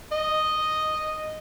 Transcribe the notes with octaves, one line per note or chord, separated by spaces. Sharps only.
D#5